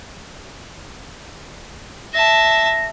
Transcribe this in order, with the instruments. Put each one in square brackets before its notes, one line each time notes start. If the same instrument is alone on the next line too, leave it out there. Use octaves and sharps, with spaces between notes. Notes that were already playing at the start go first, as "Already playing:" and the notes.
[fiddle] E5 A5 [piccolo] A#6